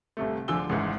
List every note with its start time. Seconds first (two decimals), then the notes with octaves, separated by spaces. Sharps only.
0.17 G1 C3 A3
0.48 D1 D3 F3 G#5 E6 G7
0.69 G#1 C#2 G#2 E3